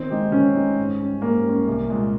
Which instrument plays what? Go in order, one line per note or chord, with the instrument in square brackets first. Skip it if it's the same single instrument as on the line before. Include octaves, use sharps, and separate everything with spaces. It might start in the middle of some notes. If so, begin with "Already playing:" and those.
Already playing: [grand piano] D#3 [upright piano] C4
[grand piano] G#3 D#4 G4
[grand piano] D#3 [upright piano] C#4
[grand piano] G#3 D#4 G4
G#2
G3 C#4
[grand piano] G#2 [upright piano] A#3
[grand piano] G3 C#4
C2
A#2 G#3